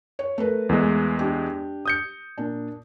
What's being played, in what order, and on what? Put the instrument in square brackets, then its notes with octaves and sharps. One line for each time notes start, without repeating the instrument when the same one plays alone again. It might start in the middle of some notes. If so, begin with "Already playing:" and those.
[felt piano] C#5
A3 A#4 B4
[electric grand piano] E2 G#3
[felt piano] D4 G4
[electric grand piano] D#6 G6 C#7
[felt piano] A#2 D4